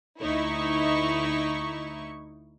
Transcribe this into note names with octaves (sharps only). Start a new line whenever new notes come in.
D2 D#4 E4 C#6